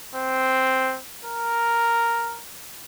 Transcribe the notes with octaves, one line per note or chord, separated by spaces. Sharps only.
C4
A#4